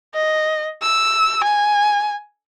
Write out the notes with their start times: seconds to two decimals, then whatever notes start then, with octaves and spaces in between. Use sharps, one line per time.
0.14 D#5
0.82 E6
1.44 G#5